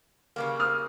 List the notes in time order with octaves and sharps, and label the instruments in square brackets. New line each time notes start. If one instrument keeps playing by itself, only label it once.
[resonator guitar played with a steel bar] C#3 G3 A#3
[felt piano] D#6 F6